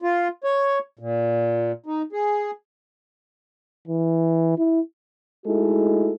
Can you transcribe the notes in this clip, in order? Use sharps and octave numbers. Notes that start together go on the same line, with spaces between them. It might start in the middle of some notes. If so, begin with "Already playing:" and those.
F4
C#5
A#2
D#4
G#4
E3
E4
G#3 A3 D#4 E4 F#4 A4